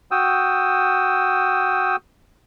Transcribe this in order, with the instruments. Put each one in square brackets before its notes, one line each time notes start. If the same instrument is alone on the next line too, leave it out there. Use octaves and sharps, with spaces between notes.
[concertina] F#4 G5 D#6 E6